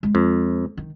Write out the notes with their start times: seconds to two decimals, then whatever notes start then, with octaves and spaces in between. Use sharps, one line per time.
0.03 G#3
0.15 F2
0.77 D#3